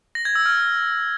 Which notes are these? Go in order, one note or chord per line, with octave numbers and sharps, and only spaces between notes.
A#6
G#6
E6
F6